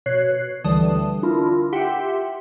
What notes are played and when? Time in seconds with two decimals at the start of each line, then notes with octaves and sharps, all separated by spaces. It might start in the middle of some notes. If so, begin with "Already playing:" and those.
0.06 B2 C#5 F#6 C7
0.64 D2 D3 E3 G3 A5 D#6
1.23 D4 E4 F4 A#4
1.73 G4 E5 F#5 G5 C6